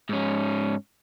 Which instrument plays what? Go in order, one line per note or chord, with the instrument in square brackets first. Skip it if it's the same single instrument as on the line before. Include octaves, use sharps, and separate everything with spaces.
[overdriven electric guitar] G#2 C#4